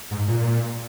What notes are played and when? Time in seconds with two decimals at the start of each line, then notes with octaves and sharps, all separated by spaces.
0.11 G#2
0.28 A#2